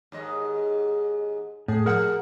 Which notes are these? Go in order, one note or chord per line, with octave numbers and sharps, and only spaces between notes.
D#2 G#2 D#5
A2 G#4
F3 G3 A#4 F#5